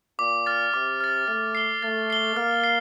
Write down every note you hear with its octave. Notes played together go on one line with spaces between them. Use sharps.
A#2 D6
F6 A6
C3 D6
F6 A6
A3 A6
C7 G7
A3 A6
C7 G7
A#3 F6
C7